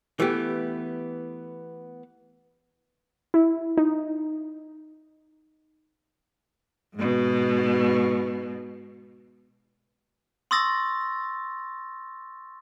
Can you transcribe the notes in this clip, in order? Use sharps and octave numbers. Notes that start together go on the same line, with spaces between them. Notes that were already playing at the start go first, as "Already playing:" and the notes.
E3 A3 B3 G4
E4
D#4
G#2 B2
C6 C#6 D#6 E6 A6 A#6